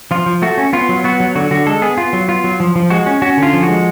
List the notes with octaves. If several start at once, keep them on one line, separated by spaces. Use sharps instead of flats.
F3 F4
F3
A3 F#4
C#4
B3 F4
F#3
B3 F#4
F#3
D3 F#4
D3 F#4
G#3 A4
B3 G#4
B3 F4
F#3
B3 F4
F#3
F3
F3
G#3 F#4
C#4
C#4 F#4
D3
F4
F3
F#4
G#3